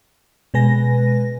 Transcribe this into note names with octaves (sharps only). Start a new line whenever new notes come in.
B2 G#3 B4 G#5 A#6